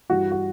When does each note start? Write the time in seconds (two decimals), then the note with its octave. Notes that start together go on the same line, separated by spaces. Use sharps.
0.10 G2 E3 F#4
0.31 F#4